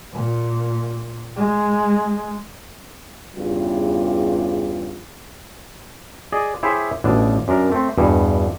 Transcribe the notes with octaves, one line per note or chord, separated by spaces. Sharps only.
A#2
G#3
E2 G2 C#3 F4 G4
G#4 D5 D#5
E4 G4 G#4 C5 C#5 E5
A1 B2 D4
F#2 D4 A#4
A3 C4
E2 G2 B2